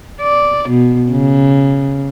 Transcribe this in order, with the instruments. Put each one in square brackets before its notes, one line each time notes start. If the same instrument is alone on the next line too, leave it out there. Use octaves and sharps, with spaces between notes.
[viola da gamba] D5
B2
C#3